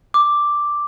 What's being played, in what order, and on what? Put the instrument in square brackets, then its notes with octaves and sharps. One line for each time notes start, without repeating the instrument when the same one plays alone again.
[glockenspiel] D6